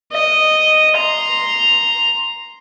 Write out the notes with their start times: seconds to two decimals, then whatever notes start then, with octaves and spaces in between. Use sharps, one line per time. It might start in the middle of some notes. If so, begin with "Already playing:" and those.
0.12 D#5
0.97 A#5 C6